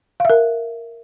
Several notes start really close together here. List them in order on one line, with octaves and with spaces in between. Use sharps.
F5 E5 A#4